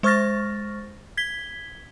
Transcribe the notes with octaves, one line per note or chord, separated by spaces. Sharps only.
G#3 C5 C#6 F6 A6 A#6
G#6 B6 G7